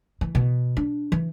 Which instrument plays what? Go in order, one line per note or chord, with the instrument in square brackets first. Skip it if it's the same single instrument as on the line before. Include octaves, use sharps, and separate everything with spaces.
[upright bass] E3
B2
D4
E3